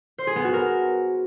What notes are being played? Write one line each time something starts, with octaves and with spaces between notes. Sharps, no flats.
C5
G#4
B3
F#4
A#4